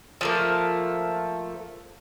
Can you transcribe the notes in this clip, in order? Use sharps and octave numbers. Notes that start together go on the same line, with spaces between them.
F3 A3 A#3